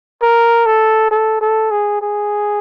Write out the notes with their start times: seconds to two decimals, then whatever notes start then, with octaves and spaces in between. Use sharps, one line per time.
0.22 A#4
0.66 A4
1.11 A4
1.41 A4
1.71 G#4
2.02 G#4